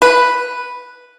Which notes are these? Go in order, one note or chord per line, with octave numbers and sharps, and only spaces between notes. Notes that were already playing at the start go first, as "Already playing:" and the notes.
B4